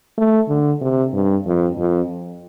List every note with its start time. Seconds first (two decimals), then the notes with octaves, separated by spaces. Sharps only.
0.18 A3
0.49 D3
0.81 C3
1.13 G2
1.46 F2
1.78 F2